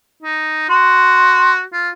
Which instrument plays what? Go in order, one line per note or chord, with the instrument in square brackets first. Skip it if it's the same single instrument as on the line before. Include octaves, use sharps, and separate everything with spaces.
[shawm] D#4
[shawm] F#4 [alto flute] C6
[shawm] F4